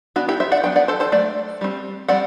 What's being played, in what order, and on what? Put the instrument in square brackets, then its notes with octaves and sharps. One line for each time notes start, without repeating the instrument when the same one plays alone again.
[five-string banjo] E3 B3 D4 F#4
E4 G4
C5 E5
D5 F#5
F#3 B3 D4 G5
D5 F#5
A4 C5
A4 C5
F#3 A3 D5
G3 C4
G3 C4 D5 F#5